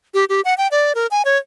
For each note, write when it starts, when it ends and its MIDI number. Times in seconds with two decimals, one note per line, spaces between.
0.14 0.25 67
0.29 0.41 67
0.45 0.54 78
0.58 0.68 79
0.71 0.93 74
0.95 1.07 70
1.11 1.22 80
1.25 1.37 73